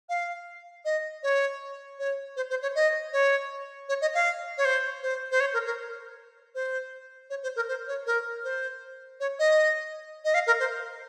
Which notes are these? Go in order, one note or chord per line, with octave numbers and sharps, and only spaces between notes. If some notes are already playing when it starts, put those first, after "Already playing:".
F5
D#5
C#5
C#5
C5
C5
C#5
D#5
C#5
C#5
D#5
F5
C#5
C5
C5
C5
C#5
A#4
A#4
C5
C#5
C5
A#4
C5
C#5
A#4
C5
C#5
D#5
D#5
F5
A#4
C5